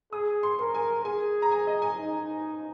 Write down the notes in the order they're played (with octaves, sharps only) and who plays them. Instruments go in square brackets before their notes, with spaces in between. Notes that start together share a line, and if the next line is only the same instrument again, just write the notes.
[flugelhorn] G#4 [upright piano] D#6
[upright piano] C6
[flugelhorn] A#4 [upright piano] C6
[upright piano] G#5
[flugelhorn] G#4 [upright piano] G#5
[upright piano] A#5
G#5
D#5
G#5
[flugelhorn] D#4